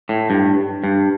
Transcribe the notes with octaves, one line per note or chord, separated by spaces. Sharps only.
A2
G2
G2